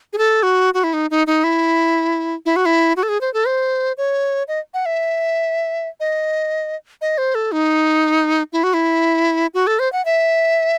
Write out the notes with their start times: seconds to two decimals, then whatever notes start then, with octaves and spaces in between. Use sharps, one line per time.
0.13 G#4
0.18 A4
0.43 F#4
0.74 F#4
0.84 E4
0.93 D#4
1.11 D#4
1.27 D#4
1.44 E4
2.46 E4
2.56 F#4
2.66 E4
2.97 F#4
3.03 A4
3.09 G#4
3.21 C5
3.34 A4
3.47 C5
3.98 C#5
4.48 D#5
4.74 F#5
4.86 E5
6.00 D#5
7.01 D#5
7.18 C5
7.35 A4
7.52 D#4
8.53 E4
8.64 F#4
8.74 E4
9.54 F#4
9.67 A4
9.79 C5
9.93 F#5
10.05 E5